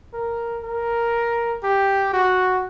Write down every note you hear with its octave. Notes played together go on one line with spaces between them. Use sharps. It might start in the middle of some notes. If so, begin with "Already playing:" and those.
A#4
A#4
G4
F#4